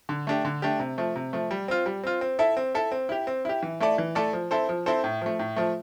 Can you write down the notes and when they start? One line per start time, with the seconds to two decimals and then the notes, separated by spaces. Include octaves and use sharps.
0.09 D3
0.27 A3 D4 G4
0.45 D3
0.62 A3 D4 G4
0.80 C3
0.98 F3 A3
1.16 C3
1.33 F3 A3
1.51 G3
1.68 C4 F4
1.86 G3
2.04 C4 F4
2.21 C4
2.39 E4 A4 E5
2.57 C4
2.75 E4 A4 E5
2.92 C4
3.09 E4 G4
3.27 C4
3.45 E4 G4
3.63 E3
3.80 A3 E4 A4 D5
3.98 E3
4.15 A3 E4 A4 D5
4.33 F3
4.51 C4 E4 A4 C5
4.69 F3
4.86 C4 E4 A4 C5
5.04 A2
5.21 F3 A3
5.39 A2
5.56 F3 A3